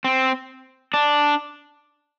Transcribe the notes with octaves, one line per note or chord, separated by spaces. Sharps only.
C4
D4